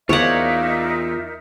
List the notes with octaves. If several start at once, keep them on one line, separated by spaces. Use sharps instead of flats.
E2 D#4 F4 A#4 C#5 D5 E5 F#5